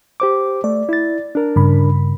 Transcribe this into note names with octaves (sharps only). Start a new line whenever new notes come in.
G4 C5 D6
A3 D5
E4 A6
D4 A#4
G2 C#3 B5